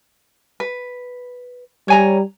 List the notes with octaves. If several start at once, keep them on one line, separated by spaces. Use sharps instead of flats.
B4
G3 C#5 G#5 A#5